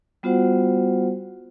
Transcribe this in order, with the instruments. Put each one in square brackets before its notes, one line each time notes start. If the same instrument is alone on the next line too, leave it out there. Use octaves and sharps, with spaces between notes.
[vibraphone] G3 B3 F4 F#4 C5 F#5